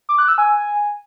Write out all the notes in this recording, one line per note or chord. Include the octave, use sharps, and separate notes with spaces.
D6
F#6
E6
G#5